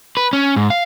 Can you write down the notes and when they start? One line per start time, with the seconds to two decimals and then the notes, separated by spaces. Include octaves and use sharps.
0.17 B4
0.33 C#4
0.56 G#2
0.70 F5